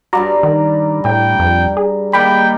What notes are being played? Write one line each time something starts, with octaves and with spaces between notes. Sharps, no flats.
G2 G3 F#4 D5 A#5
D#3
A2 G5
F2
G#4
D#3 G3 A#3 G5 B5